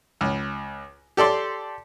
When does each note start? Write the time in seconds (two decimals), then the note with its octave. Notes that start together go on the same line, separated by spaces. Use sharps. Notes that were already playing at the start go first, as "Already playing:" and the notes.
0.21 C#2
1.17 G4 A4 D5 C6